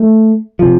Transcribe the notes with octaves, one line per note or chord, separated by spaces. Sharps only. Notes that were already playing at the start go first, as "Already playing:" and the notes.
Already playing: A3
C3 F3